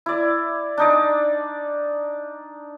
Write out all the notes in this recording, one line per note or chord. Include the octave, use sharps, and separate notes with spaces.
E4 D5
D4 D#4 D5